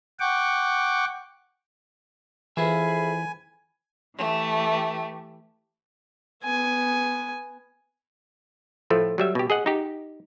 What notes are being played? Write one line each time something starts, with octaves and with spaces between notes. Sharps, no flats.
F#5 G5 C#6 D6
F2 E3 F4 G#4 E5 G#5 B5
E3 A3 G4
B3 G#5
A2 F3 A3
F#3 G3 E5
B2 G4
G#4 D#5 F#5
D#4 G4